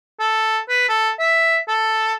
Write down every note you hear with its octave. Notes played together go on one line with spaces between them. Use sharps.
A4
B4
A4
E5
A4